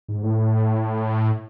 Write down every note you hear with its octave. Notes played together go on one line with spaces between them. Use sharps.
G#2
A2